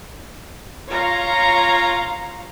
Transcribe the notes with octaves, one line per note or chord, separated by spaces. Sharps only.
F4 C#5 F5 A#5 C6